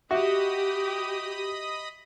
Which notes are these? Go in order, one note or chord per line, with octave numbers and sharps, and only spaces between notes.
F#4 G4 D#5 E5 B5 D#6